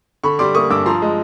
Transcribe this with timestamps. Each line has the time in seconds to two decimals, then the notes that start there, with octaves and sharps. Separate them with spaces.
0.24 D3 B5 C#6
0.39 G3 C6 D6
0.55 A#3 C#6 D#6
0.70 G2 D6 E6
0.86 F3 A#5 C6
1.02 G#3